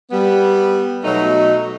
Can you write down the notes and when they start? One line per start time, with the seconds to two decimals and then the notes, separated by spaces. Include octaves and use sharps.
0.11 G3 B3
1.04 B2 F#3 A3 D#4